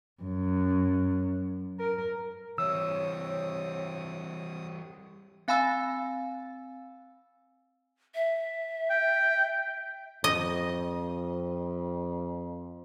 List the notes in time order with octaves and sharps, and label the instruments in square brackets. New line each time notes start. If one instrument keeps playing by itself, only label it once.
[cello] F#2
A#4
[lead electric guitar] E3 G3 [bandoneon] C4 D#6 [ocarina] C#5 [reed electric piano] E6
[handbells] C4 F5 G#5 B5 E6 A6
[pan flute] E5
[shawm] G5
[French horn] F2 [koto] D#5